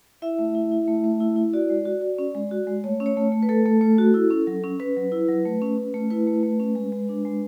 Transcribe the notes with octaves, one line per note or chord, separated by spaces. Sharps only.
E4 E5
A3
E4
E4
A3
A3
E4
E4
F#4 D5
G#3
F#4
F#4
C#4
G#3
F#4
G#3
A3 C#5
C#4
C#5
A3
A3
B4
A3 A4
A3
A3
F#4
E4
C#4
F#3
C#4
C#4 B4
F#3
E4
F#3
A3
C#4
C#4
A3
E4 B4
A3
A3
C#4
G#3
G#3
D4
G#3